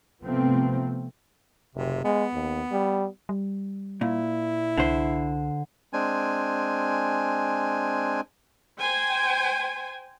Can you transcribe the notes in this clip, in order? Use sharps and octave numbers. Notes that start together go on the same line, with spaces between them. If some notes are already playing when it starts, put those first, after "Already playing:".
C3 F3 A3 B3 C4
F#1 C3
G#3 B3
D#2
G3
G3
A#2 E4
C2 D3 C5
G#3 C4 D4 G#5
C5 G5 G#5